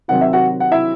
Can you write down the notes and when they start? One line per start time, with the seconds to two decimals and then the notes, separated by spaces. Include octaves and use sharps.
0.08 C3 D#3 F#3 C4 F#5
0.21 E5
0.33 F#4 F#5
0.60 F#5
0.72 E4 E5